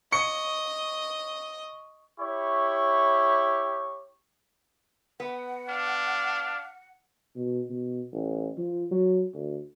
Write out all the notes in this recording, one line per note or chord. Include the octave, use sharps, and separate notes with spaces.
D#5 C#6 C#7
E4 G4 C#5 C#6
B3 F#5
D4 F5
B2
B2
A1
F3
F#3
D2